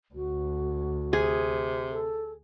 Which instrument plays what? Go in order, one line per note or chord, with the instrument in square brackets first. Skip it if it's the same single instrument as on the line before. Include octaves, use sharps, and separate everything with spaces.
[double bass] D2 [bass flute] F#4
[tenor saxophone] C3 [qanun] G#4
[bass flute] A4